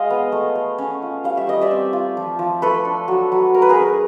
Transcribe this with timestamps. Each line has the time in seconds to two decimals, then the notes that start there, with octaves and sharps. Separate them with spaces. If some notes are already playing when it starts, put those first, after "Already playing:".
Already playing: G#3 D#5 F5
0.10 B3
0.32 A3
0.56 A3
0.78 C#4
1.02 F4
1.24 G3 F5
1.37 E5
1.47 G3 D#5
1.61 D5 E5
1.71 C4
1.93 F4
2.17 F3
2.39 F3
2.62 A3 A4 B4
2.85 D4
3.08 F#3
3.32 F#3
3.54 A3 A#4
3.62 B4
3.69 G#4 A#4
3.78 C#4